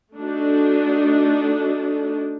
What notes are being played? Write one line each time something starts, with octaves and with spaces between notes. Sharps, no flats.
A3 D4 D#4 F#4 A4